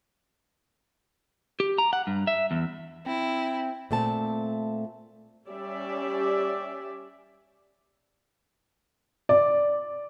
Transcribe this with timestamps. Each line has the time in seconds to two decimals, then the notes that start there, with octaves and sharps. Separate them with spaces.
1.60 G4
1.78 A#5
1.93 F#5
2.07 G2
2.27 E5
2.51 E2
3.06 C4 E4
3.91 A#2 A3 C4 A5
5.48 G3 C#4 G4 D5 E5
9.29 D5